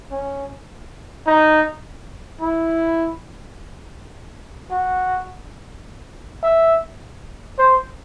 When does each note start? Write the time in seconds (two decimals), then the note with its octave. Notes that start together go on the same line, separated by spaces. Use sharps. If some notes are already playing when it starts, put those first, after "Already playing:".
0.11 C#4
1.27 D#4
2.41 E4
4.71 F#4
6.43 E5
7.58 C5